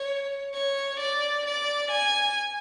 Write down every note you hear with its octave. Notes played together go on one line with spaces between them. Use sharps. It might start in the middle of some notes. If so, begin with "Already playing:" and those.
Already playing: C#5
C#5
D5
D5
G#5